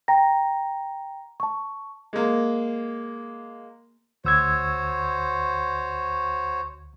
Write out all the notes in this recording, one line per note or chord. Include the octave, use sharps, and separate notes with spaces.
G5 A#5 A#6
A5 C#6
G#3 A#3
D2 F#4 C5 C#5 E6 G#6